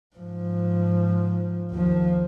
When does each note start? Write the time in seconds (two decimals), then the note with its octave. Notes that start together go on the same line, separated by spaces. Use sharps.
0.16 G#2 F3
1.71 D#2 F3